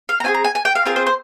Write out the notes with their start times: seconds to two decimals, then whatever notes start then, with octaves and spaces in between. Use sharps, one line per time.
0.09 F5
0.20 A#5
0.24 C4 F4 G#4 G#5
0.34 A#5
0.44 G#5
0.55 G#5
0.65 G5
0.75 F5
0.86 C4 F4 G#4 A#4
0.96 C5
1.07 C5